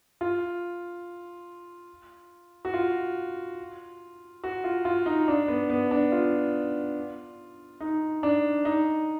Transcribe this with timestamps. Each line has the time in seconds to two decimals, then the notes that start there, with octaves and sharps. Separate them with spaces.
0.21 F4
2.65 F#4
2.74 F4
4.44 F#4
4.64 F4
4.85 F4
5.06 D#4
5.28 D4
5.48 B3
5.70 B3
5.91 D4
6.12 F4
7.80 D#4
8.23 D4
8.65 D#4